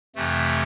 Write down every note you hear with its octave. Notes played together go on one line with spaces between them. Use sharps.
F2 C3 E3 A3